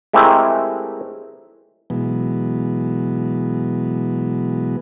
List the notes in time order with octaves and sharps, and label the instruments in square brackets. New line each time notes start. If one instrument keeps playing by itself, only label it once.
[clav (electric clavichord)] G#3 A3 C4 E4 G4 A#4
[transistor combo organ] B2 E3 F#3 G#3 B3